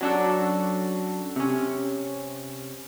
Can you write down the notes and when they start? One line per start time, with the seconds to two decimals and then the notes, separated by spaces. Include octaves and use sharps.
0.01 F#3 C#4 D4 F#4 A4
1.36 C3 C#4